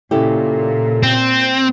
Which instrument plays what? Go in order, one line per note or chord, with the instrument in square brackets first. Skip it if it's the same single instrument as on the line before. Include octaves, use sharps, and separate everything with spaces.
[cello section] A#2 [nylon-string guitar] C#3 E4 G4 [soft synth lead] A4
[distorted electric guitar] C4 [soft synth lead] G6